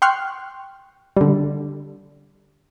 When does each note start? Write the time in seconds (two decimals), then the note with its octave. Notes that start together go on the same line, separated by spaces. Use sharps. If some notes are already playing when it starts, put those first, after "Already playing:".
0.02 G5 C6 C#6 F6 F#6
1.16 D3 G3